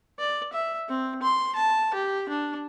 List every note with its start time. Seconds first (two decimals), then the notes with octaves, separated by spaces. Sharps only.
0.19 D5
0.53 E5
0.89 C4
1.22 C6
1.55 A5
1.94 G4
2.29 D4